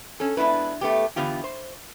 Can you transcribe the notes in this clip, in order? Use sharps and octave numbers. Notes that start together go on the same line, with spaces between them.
C#4 A4
G#3 B3 D4 E4 B4
A3 B3 G4
E2 D3 B3 F4 G4
C5